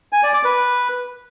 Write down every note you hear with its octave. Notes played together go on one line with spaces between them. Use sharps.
G#5
D5
D6
B4